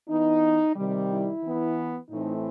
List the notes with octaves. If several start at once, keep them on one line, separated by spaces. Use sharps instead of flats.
E3 B3 D#4
C3 D#3 G3
E4
E3 B3
A2 E3 A3 C4 D#4